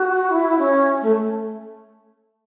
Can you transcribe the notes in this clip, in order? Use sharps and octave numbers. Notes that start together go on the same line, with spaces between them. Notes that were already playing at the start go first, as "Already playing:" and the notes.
Already playing: F#4
E4
C#4
A3